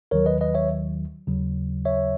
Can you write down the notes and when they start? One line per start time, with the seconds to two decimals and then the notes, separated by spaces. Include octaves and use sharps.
0.11 D#2 D#3 F#3 A#4 C#5
0.26 B4 D#5
0.41 B4 D#5
0.54 C#5 E5
1.27 D#2 C#3 F#3
1.85 C#5 E5